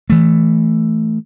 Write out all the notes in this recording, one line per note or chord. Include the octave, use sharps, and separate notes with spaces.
E3 A3